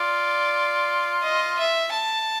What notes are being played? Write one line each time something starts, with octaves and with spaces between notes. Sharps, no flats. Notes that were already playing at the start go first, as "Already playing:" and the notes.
Already playing: F4 D5
D#5
E5
A5